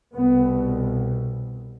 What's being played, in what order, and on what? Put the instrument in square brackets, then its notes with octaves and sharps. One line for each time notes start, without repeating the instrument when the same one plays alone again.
[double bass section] C2 B2 B3